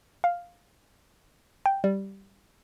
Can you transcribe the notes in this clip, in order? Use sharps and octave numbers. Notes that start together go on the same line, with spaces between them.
F5
G5
G3